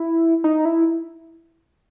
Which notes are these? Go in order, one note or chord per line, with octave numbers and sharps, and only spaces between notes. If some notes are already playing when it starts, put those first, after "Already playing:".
Already playing: E4
D#4
E4